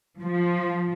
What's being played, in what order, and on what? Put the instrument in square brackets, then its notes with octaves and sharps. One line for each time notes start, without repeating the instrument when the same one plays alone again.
[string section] F3